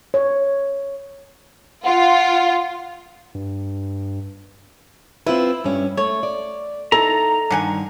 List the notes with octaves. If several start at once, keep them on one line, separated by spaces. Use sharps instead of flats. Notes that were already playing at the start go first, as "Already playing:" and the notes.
C#5
F4 F#5
G2
C4 E4 F4 B4
G2 C#4
A3 C#5
D5
D#4 E4 A4 A#5
G2 D3 D#3 F#5 G#5